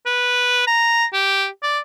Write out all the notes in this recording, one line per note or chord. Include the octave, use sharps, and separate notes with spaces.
B4
A#5
G4
D5